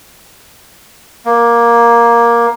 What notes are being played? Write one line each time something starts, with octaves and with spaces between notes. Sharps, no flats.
A#3